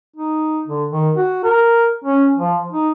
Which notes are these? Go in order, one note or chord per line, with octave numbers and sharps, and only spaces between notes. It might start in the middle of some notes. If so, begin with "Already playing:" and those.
D#4
D3
D#3
F#4
A#4
C#4
F3
D#4